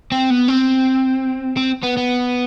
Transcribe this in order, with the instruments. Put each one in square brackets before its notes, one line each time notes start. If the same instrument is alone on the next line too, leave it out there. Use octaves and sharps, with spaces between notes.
[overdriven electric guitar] C4
B3
C4
C4
B3
B3